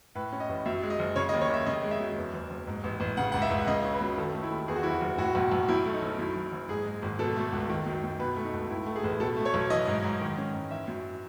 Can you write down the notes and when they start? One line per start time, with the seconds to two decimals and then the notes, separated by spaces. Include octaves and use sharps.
0.15 A2 B4
0.32 C#4
0.40 D#5
0.49 A1
0.66 F#2 E5
0.83 G#3
0.90 D#5
0.99 F#1
1.16 C#3 C#5
1.29 D#5
1.33 D#2
1.41 C#5
1.50 D#2 E5
1.66 C#3 D#5
1.83 G#3
1.91 E5
2.00 F#2
2.17 E2
2.34 F#1
2.50 F#1
2.67 G#2
2.84 A1
3.00 A1
3.17 C#3 F#5
3.32 C#2 F#5
3.42 E5
3.50 C#2
3.67 C#3 D#5
3.84 C#4
3.92 B4
4.01 F#2
4.17 D#3 A4
4.35 A3
4.43 E4
4.51 D#2
4.68 E2 G#4
4.76 F#4
4.83 F#1 E4
4.91 F#4
5.01 F#1
5.18 A2 F#4
5.35 B1
5.51 B1
5.68 F#2 E4
5.85 A3
5.93 D#4
6.02 F#1
6.19 F#2 E4
6.35 F#1
6.52 F#1
6.69 G#2 G#4
6.86 G#3
7.02 G#1
7.19 B2 A4
7.36 A3
7.52 C#2
7.69 D#3
7.86 F#2
8.04 F#2
8.19 B2 B4
8.36 A3
8.45 D#4
8.53 C#2
8.70 A2 E4
8.86 A3
8.96 G#4
9.04 A1
9.20 B2 A4
9.37 A3
9.45 C#5
9.54 B1
9.70 E3 D#5
9.87 G#2
10.04 G#2
10.21 D#3
10.38 C#4
10.54 G#2
10.71 E3 E5
10.88 F#2